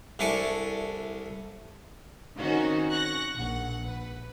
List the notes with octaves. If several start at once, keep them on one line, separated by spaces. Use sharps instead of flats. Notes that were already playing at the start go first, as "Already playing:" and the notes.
C2 D4 E4 A4 G#5 C#6
D#3 C4 C#4 F#4
C#6 F#6 A#6
A#1 F#5
B4